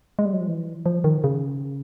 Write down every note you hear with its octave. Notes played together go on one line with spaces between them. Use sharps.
G#3
G3
F#3
F3
E3
F3
D#3
C#3